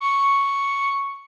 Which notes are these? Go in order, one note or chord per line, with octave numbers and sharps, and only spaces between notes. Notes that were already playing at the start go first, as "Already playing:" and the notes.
C#6